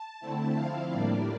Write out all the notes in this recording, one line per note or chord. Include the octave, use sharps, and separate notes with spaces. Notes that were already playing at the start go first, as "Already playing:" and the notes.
Already playing: A5
D3 A3 C4 E4
F3 C4 E4 F5
A2 G3 A#3 D4 D5